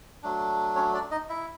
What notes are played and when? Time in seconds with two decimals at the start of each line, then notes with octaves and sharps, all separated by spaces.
0.23 F#3 A3 D4
0.76 C#4 C#5
0.94 D4 D5
1.11 D#4 D#5
1.29 E4 E5